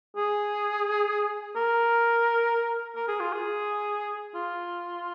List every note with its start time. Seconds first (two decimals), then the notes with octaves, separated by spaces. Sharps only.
0.17 G#4
1.56 A#4
2.96 A#4
3.08 G#4
3.20 F4
3.32 G#4
4.35 F4